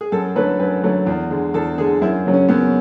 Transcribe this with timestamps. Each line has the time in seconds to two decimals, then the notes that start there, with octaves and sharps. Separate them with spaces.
0.01 G#4
0.12 F#2 A4
0.36 D3 F#3 A3 B4
0.60 F#2 B4
0.83 D3 F#3 A3
1.07 E2
1.31 D3 G#3
1.54 E2 A4
1.78 D3 G#3 G#4
2.01 F#2 E4
2.26 C#3 F#3
2.34 C#4
2.49 F#2 B3